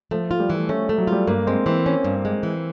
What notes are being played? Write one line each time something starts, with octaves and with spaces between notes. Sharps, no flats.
F3 A3
F4
G3
E3
A3
A3 C#4
A3
F#3
G3 F4
G2 A#3
G#3 C4
E3 C4
C#4
G2
G#3
E3